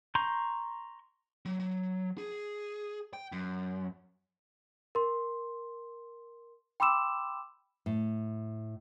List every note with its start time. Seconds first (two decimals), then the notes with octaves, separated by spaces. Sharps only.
0.15 A#5 C6 C#6 G6
1.46 F#3
1.60 F#3
2.18 G#4
3.13 G5
3.32 F#2
4.95 A#4 C6
6.80 G5 B5 C6 D6 E6 E7
7.86 A2